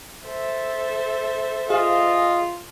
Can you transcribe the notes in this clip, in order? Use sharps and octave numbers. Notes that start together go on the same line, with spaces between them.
A4 C5 E5
F4 G#4 D#5 F5